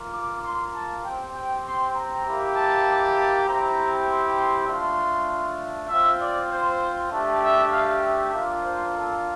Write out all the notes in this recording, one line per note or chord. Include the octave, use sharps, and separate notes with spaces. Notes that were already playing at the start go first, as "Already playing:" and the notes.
Already playing: A#3 F4
D6
C6
A5
C4 G4 G5
G5
C6
A#5
A#3 E4 G4
A5
A5
C4 E4 G4 A#5
C6
C6
A3 D4 F4 C6
C4 F4 E5
D5
C5
A3 D4 G4
E5
F5
E5
A#3 D4 F4
C5
A4